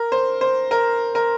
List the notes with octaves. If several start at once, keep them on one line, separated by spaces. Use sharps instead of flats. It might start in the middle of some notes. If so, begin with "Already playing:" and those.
Already playing: A#4
C5
C5
A#4
A#4